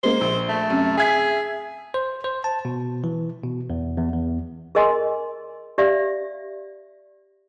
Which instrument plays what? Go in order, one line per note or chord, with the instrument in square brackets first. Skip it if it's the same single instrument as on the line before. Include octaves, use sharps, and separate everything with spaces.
[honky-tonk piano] G#3 A#3 [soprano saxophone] C5
[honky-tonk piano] A#1
[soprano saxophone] A3
[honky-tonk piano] F#2 C3
[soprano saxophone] G#4 [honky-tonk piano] E5 G#6 B6
[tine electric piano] C5
C5
A5
B2
E3
B2
E2
E2
E2
[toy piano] G#4 A#4 D#5 G#5 C6
G4 D5 E5 F5